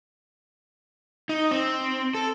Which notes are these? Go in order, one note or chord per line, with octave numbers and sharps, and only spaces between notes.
D#4
C4
A4